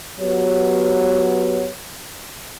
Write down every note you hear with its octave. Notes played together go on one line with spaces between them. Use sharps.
F#3 B3 G4 B4 C#5